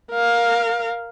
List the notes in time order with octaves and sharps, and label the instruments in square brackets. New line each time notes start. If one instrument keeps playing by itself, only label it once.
[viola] A#4 F5